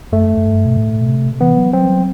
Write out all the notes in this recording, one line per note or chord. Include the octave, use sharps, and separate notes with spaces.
F#2 A3
F#2
G2
B2
A2
B2
C3
E3 B3
F#3
F#3 C4
F#3